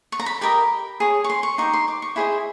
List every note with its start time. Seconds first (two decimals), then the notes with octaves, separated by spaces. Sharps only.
0.12 C#6
0.20 A#5
0.26 B5
0.41 G4 A#4 D#5 B5
1.00 G#4 C#5
1.24 C#6
1.30 C6
1.43 C#6
1.58 D#4 G4 C5 C#6
1.73 C6
1.88 D6
2.02 C#6
2.16 E4 G#4 C5 D#5 B5